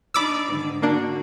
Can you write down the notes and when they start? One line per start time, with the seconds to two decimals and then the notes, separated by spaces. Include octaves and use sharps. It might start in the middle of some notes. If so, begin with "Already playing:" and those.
0.14 D4 D#4 D5 B5 D6 E6
0.50 G#2 D3 D#3
0.82 D3 A#3 D4 F#4